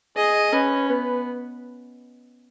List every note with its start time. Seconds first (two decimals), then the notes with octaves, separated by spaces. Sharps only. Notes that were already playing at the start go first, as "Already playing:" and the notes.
0.17 G#4 D#5
0.53 C#4 B4
0.89 B3 B4